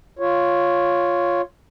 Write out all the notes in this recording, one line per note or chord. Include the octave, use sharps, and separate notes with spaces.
F4 C#5